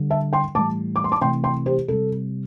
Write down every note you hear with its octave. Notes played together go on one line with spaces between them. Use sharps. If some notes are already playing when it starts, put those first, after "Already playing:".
Already playing: D3 G3
E5 A5
G5 C6
A2 E3 G3 A5 D6
D6
C6
A5 D6
C3 E3 A3 G5 C6
G5 C6
G4 C5
C3 G3 A4